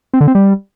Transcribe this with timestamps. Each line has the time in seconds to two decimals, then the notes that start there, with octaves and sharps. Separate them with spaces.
0.13 C4
0.21 D3
0.28 C4
0.35 G3